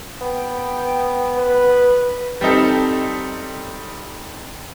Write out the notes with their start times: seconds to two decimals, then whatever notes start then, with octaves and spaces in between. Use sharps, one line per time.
0.21 B3 G5
1.38 B4
2.41 G3 C4 D#4 A4